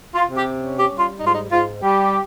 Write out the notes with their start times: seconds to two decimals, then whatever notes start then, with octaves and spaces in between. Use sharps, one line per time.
0.15 F4
0.25 C3
0.35 G4
0.56 C#4
0.77 G4
0.88 G3
0.98 F4
1.19 G#2 D#4
1.26 F4
1.34 D#4
1.50 G#2 F4
1.81 G3 G4